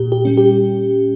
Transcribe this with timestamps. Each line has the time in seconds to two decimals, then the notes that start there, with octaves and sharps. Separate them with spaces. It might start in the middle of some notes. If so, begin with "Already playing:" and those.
Already playing: A#2 G4
0.12 G4
0.25 G3 C#4
0.37 G4